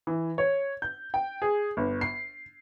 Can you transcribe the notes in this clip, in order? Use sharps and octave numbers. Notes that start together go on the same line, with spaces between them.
E3
C#5
G6
G5
G#4
G1
C7